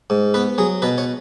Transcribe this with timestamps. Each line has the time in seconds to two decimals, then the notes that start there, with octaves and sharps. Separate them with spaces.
0.10 G#2
0.34 B3 B4
0.58 F#3 G#4
0.82 B2 B4
0.98 C#5